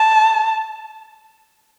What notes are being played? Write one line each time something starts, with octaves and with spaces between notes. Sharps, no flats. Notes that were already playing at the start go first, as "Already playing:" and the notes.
Already playing: A5